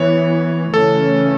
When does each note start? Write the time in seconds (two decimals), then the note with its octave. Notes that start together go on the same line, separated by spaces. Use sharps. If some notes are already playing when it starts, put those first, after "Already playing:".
Already playing: E3 B3 C#5
0.73 C#3 E3 A3 C#4 A4